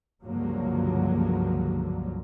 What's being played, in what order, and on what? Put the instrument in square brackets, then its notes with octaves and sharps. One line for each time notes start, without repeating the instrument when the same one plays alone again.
[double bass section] C#2 G2 D3 F3 F#3 A#3